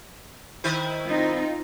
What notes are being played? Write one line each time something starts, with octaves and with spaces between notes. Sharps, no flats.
D#3 E4 C5
C4 D#4 F4